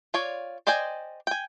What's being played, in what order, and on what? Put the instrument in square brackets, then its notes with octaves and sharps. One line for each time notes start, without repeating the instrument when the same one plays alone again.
[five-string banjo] F4 C#5 D5
C5 D5 D#5 G5 G#5
G5 G#5